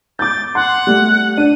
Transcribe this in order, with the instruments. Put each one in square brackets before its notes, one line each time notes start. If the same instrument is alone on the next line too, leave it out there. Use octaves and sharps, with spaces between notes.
[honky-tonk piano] D6 G6 [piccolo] A6
[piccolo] F#5 [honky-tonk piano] C6
[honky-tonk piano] G3 A3
[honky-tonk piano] D4 [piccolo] D#7